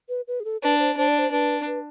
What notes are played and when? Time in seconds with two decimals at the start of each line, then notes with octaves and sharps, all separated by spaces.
0.09 B4
0.28 B4
0.40 G#4
0.45 A4
0.62 D4 B4
0.79 C5
0.97 D4 C5
1.08 D5
1.19 C5
1.32 D4 B4
1.67 B4